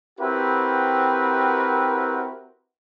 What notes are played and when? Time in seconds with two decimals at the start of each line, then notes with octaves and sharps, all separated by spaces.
0.20 C4 E4 F#4 G4 A#4 B4